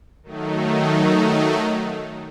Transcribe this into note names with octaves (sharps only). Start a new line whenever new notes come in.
D#3 F#3 A3 D#4